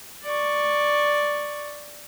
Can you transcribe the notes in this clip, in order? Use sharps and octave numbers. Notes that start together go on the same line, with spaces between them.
D5 C#6